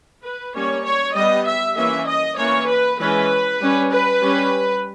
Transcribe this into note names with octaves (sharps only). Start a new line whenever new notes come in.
B4
G3 A#3 C#4 C#5
C#5
G3 B3 D#5
E5
E3 A#3 C#4 E5
D#5
E3 A#3 C#4 C#5
B4
E3 G#3 C#4 B4
G3 C#4
B4
G3 C#4